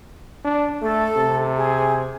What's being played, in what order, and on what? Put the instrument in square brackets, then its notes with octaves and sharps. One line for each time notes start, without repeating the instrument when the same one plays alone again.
[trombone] D4
[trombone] A3 [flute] A4
[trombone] C3
[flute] G#4